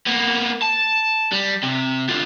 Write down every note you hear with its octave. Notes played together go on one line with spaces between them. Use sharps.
A#3 B3
A5
G3
C3
D3 F4